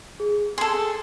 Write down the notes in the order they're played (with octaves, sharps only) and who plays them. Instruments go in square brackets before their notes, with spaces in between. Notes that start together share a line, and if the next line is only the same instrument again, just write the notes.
[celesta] G#4
[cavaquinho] G#4 A4 [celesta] C6